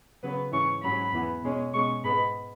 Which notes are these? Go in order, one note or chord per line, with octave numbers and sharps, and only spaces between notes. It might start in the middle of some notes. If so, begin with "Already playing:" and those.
C#3 F#3 B3 B4
G#2 E3 C#4 C#6
G#2 F#3 C#4 B5
E2 E3 B3
B2 G#3 C#4
B2 G#3 C#4 C#6
G#2 G#3 B3 B5